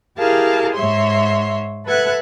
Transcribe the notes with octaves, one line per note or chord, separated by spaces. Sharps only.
E4 G4 G#4 A#4 F5 A5
G#2 C#5 E5 C6
A4 B4 E5 F#5 F#6 G#6